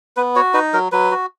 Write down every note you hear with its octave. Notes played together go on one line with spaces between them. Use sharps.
B3 B4
F#4 C#5
D#4 B4
F#3 A#4
F#3 B4
F#4